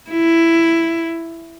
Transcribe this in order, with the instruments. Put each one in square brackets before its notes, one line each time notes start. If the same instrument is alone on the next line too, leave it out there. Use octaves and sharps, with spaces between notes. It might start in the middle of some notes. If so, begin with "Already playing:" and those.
[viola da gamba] E4